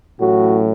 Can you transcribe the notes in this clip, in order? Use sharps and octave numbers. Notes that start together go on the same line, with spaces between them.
A1 A2 F#3 F#4